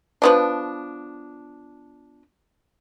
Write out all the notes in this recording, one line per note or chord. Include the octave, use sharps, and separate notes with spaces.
F3 B3 D4